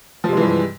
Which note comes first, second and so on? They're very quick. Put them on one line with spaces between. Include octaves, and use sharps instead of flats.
F3 C3 G#3 E3 G2